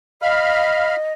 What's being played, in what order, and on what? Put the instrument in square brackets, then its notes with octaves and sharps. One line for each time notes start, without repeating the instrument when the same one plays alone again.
[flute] D#5 [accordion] F5 B5 F6